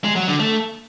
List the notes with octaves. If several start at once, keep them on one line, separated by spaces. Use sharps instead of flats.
G#3
F#3
D3
A3